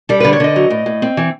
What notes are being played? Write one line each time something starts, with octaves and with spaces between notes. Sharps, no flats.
G3 A4
B4
D3
C#5
D3 D#5
F#3
A2
A2
C4
E3